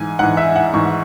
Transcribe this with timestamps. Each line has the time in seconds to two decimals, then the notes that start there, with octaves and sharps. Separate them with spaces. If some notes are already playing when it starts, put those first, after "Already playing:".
Already playing: G#2 E3 G#5
0.19 G#2 E3 F#5
0.37 E5
0.56 F#5
0.73 G#2 E3 C#6